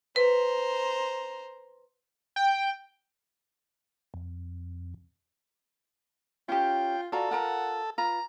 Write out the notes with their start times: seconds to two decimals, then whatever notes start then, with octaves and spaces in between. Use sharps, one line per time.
0.16 B4 C5 A#5
2.36 G5
4.14 F2
6.49 C#4 F4 G4 G5
7.12 F4 F#4 A4 D5 A#5
7.31 F4 A#4 F#5 A#5
7.98 F4 B4 A#5